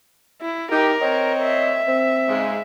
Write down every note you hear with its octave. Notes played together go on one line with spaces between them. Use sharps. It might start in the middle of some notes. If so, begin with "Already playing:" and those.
E4
D#4 G4 A#4
C4 C#5 D#5
E5
C4
G#2 C#3 G#3